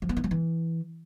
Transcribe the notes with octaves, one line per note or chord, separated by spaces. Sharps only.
F3
B3
D#3
F3
E3